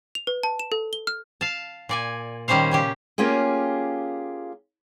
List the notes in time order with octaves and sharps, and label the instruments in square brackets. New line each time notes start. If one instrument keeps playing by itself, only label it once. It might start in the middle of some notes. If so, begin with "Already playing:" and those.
[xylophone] F7
B4
A5
E7
A4
G7
F6
[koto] F5 A5
A#2 D5 G#5
A#2 D#3 G3 C#4 C5 F5
C#3 C#4 G4
[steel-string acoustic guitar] A#3 C#4 F4 G4 G#4